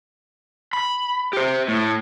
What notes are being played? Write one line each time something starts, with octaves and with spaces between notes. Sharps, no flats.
B5
G4 C5
A2